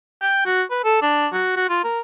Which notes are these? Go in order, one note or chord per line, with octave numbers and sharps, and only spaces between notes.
G5
F#4
B4
A4
D4
F#4
F#4
F4
A#4